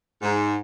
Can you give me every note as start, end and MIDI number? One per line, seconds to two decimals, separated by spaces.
0.22 0.55 44